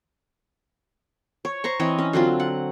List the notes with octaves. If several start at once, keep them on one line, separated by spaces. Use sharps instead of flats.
C#5
C5 A#5 C#6
E3 C4 C#5 D#5
C#4
D3 F#3 C4 F4
F#5